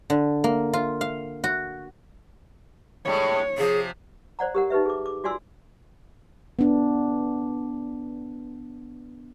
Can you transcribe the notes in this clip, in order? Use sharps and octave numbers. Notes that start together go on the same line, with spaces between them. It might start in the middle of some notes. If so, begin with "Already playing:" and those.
D3
A#3
F4
F5
F#4
A2 G3 G#3 C#5
C3 F3 G#4
C5 D5 F#5 A#5
G4 A#4 F#5
D#4 G4 B4 E5
G#4 D6
D6
F4 F#4 D5 G#5 C6 E6
B3 D4